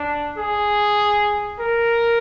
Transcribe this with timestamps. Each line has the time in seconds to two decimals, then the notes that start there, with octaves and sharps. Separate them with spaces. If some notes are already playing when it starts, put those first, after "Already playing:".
Already playing: D4
0.38 G#4
1.60 A#4